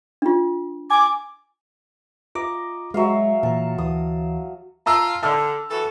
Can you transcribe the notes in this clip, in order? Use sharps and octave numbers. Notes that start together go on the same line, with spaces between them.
D4 F4
G#5 D6
F4 D#5 A#5 D6
F#3 G#3 E5 F5
A#2 E3 A5 A#5
D2 E3 D#6
F4 A5 A#5 E6
D3 A5 E6 F6
E3 F#4 A4